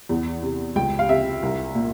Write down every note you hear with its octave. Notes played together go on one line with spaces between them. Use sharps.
E2
C3
C#2 G5
F5
C3 E5
C2
A#2